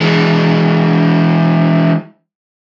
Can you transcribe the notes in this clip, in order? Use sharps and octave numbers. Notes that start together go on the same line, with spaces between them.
E3 G#3